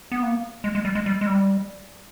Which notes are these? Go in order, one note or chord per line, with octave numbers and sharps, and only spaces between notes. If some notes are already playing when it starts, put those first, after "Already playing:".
B3
A#3
G#3
G#3
G3
G#3
G3
G#3
G3